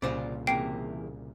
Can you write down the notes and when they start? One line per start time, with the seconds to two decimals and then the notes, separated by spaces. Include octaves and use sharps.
0.02 C2 A#2 C#3 F4 C5 D5
0.47 E2 C3 A#3 G5 C7 D7